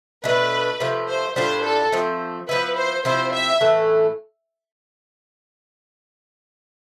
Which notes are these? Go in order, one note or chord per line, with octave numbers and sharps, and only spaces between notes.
B2 A3 D4 B4
C3 F3 A3
C5
A2 G3 D4 F4 C5
A4
F3 A3 C4
F3 B3 E4 B4
C5
C3 F3 C4 E4 C5
E5
A2 E3 A3